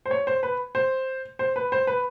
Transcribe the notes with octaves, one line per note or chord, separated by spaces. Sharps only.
C5
C#5
C5
B4
C5
C5
B4
C5
B4